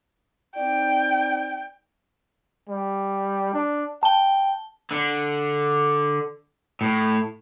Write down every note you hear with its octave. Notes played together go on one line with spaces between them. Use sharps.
C4 D#4 D5 G5
G3
D4
G5 A5 G7
D3
A2